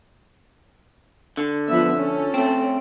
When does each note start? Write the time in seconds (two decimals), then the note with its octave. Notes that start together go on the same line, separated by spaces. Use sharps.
1.37 D3
1.67 F3 B3 E5
1.98 C#4 A4
2.34 A3 C4